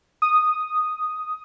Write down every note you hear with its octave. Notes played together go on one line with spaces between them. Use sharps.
D#6